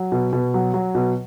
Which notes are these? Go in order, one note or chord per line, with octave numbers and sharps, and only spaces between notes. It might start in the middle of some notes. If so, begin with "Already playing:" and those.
Already playing: F#3
B2
B2
F#3
F#3
B2